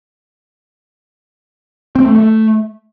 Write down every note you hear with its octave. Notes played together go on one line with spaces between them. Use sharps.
C4
A3
A3